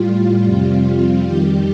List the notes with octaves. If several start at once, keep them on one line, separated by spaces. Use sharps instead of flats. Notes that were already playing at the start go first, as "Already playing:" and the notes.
Already playing: A2 G3 F4
F2 C3 G3
F2 D#3 G3 G4